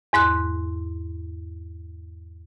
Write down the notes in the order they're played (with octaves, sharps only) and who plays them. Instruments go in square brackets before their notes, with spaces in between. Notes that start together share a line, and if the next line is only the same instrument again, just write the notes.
[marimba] E2 G#2 C6 F#6